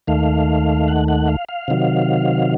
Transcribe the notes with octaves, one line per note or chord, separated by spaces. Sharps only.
D#2 D#3 A3 F5
F#5
F#5
F5
F5
C3 D#3 F#3